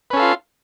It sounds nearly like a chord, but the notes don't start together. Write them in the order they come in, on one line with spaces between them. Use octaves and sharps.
B4 C#4 A4 F5 F4